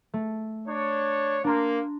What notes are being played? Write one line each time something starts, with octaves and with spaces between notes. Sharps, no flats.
A3
D4 C#5
A#3 D4 A#5 C6